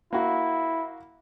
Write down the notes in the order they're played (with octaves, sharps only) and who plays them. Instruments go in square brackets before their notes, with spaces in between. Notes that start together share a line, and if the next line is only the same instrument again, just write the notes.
[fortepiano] A#3 F#4 [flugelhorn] E4